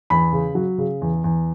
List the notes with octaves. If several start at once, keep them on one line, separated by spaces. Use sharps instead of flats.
E2 B5
C#3
F#3
C#3
E2
E2